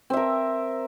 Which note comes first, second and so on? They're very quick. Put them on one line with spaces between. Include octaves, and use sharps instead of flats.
C4 E5 A#4